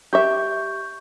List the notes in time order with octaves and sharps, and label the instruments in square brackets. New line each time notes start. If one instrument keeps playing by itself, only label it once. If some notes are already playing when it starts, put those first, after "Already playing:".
[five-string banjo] G4 E5 [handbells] C#6 G6